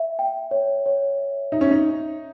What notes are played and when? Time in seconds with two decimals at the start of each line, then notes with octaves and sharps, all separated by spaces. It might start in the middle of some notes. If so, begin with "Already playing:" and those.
Already playing: E5
0.19 G5
0.51 C#5
0.86 C#5
1.18 E5
1.52 D#4 E5
1.61 C#4
1.71 D#4